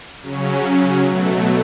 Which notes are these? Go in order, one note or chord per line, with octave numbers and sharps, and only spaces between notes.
C#3 F#3 C#4
B2 F#3 A3